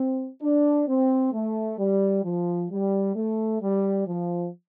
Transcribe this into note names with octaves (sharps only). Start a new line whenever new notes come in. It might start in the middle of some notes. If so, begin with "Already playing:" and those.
Already playing: C4
D4
C4
A3
G3
F3
G3
A3
G3
F3